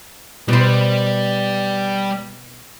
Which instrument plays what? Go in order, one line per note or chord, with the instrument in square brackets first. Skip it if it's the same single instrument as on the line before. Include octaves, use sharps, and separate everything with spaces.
[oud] B2 C5 [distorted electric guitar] G3